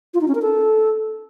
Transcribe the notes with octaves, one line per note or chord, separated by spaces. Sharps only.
F4
D#4
C#4
A#4
A4